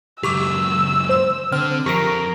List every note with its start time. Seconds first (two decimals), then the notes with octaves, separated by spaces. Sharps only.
0.23 C#2 F#2 G4 C#6 D6 E6
1.09 C5 E7
1.52 D3 C4 F6
1.86 F2 G4 A#4 C#6 A#6 C7 D7